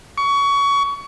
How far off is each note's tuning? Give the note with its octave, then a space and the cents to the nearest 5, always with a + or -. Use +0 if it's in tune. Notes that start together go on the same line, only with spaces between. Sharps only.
C#6 +25